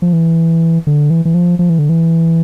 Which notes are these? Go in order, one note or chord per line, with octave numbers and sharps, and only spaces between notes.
F3
E3
D3
E3
E3
F3
F3
E3
D3
E3